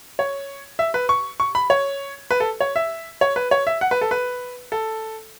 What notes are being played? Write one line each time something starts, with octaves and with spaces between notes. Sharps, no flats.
C#5
E5
B4
C#6
C#6
B5
C#5
B4
A4
C#5
E5
C#5
B4
C#5
E5
F#5
B4
A4
B4
A4